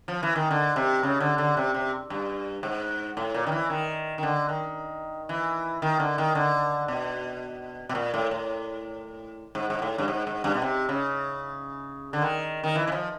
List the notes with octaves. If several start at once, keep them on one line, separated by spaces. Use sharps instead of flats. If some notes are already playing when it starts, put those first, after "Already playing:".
F3
E3
D#3
D3
C3
C#3
D3
D3
C3
C3
G2
G#2
A2
A#2
D#3
E3
D#3
D#3
D3
D#3
E3
D#3
D3
D#3
D3
B2
B2
A#2
A2
A2
G#2
G#2
A2
G2
G#2
G#2
G2
B2
C3
C#3
D3
D#3
D#3
E3
E3
F3